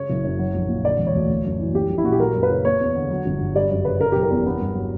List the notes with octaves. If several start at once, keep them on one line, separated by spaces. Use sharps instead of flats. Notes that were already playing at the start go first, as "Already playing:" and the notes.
Already playing: C#3 C#5
F#1
F#2
F#3
A#1
A#2
D3 D5
E1
C#5
D2
A#3
F#2
E3
A#3 G4
A#1
E4
A#2 F#4
G4
F#3 A#4
F#2
B4
C#3
A#3 C#5
E2
D3
F#3
G1
G2
G3 D5
F#2
C#3 B4
C#3 A#4
F#1 G4
A#4
E2
B3
G2
F#3